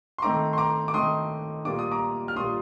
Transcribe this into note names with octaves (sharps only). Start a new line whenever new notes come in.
C6
D#3 A3 C4 D#4 A#5 D6
C6
A#5 D6
D6
D#3 A3 C4 D#4 C6 D#6
A#2 G3 A#3 F4 D6
D#6
A#5 D6
F6
A#2 G3 A#3 F4 C6 D#6